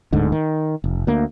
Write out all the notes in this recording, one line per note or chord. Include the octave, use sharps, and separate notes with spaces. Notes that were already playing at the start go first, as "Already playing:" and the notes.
D1 D2 G#2 D3
D#3
F1
D2 A#3